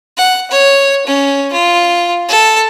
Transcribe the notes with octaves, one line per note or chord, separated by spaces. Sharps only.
F#5
C#5
C#4
F4
A4